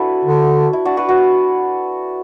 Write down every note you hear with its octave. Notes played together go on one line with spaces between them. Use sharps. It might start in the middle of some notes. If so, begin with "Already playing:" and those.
Already playing: D4 E4 F#4 A4 B4
D3
E4
D4 F#4
F#4 B4
F#4 B4